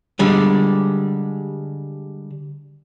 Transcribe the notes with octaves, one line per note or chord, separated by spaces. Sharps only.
D3 G3 G#3